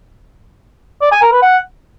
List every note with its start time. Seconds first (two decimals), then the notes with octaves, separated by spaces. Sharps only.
1.02 D5
1.12 G#5
1.22 A#4
1.32 B4
1.42 F#5